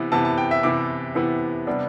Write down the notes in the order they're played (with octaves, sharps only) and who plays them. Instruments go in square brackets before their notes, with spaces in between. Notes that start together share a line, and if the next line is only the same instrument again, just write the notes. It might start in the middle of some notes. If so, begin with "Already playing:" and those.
Already playing: [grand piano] C3 E3 B3 E4
C3 E3 B3 E4 A5
A5
G5
E5
C3 E3 B3 E4 D6
C3 E3 B3 E4
C3 G3 B3 D4